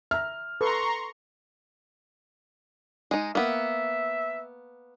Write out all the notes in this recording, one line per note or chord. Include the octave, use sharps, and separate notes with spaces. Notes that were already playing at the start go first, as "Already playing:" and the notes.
E5 A#5 F6
A4 B4 A#5 C6 C#6
G#3 D#4
A#3 B3 E5